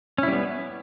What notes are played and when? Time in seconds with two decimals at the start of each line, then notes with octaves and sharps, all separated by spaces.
0.18 C#4
0.23 E4
0.28 G3
0.33 B3